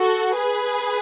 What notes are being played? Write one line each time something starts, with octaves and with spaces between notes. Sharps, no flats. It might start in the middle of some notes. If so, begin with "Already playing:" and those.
Already playing: F#4 A4
G#4 B4